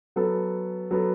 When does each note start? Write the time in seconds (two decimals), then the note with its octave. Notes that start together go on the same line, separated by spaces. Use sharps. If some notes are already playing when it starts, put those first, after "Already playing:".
0.16 F#3 B3 A4
0.91 F#3 B3 A4